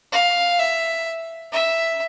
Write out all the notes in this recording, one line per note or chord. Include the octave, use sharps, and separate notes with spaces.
F5
E5
E5